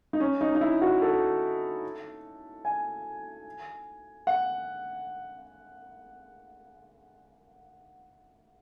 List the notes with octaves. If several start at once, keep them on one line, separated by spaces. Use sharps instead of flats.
D#4
C#4
D#4
D#4
E4
F#4
A4
G#5
F#5